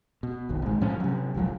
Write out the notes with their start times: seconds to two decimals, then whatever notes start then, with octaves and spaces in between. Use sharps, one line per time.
0.23 B2
0.49 F#1 B1 D#3
0.62 G#1 G#2
0.81 A2 F3 C#4
1.00 C3 F#3
1.34 D#1 C2 F3 F#3